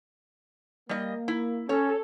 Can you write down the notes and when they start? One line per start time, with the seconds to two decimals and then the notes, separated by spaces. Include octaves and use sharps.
0.89 G3 A#3 D#5
1.28 E4
1.69 C#4 A4 C#5